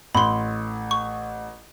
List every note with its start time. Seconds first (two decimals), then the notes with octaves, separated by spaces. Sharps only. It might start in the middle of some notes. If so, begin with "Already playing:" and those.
0.15 A1 B5 C6
0.91 C#6